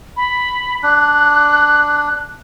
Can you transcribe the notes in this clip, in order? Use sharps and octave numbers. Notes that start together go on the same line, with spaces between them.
B5
D4 F#6